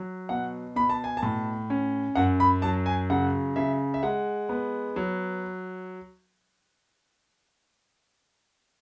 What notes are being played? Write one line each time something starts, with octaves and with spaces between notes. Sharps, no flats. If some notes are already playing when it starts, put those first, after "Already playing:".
Already playing: F#3
B2 F#5
B2 B5
A5
G#5
A5
A2
C#4
F#2 F#5
B5
F#3 A5
G#5
C#3 F#5
C#3 E5
E5
G#3 F#5
B3
F#3